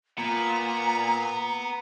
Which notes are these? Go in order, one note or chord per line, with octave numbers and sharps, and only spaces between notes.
A#2 B3 A#5